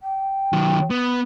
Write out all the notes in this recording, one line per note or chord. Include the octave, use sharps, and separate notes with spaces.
G5
D#3 F#3
B3